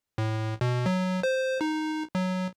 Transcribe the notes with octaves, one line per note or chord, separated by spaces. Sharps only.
A2
B2
F#3
C5
D#4
F#3